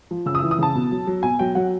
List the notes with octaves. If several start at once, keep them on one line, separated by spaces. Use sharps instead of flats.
F3
C#3 E6
D#6
E6
E3
D#6
C#3 A5
B2
F#3
F#3
B2 G#5
F#3 G5
F#3 F#5